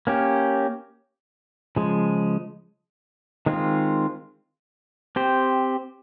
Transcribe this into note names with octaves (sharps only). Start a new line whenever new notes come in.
A#3 C#4 G4
C#3 F3 G#3
D#3 G#3 C4 F4
C4 G4 C5